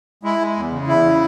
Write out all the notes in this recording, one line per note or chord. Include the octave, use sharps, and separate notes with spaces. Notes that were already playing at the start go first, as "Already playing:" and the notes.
G#3 E4
G#3
E2
C#3
E2 E4
C#3